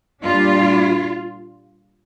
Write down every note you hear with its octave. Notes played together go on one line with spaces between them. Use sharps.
A#2 G3 D4 F4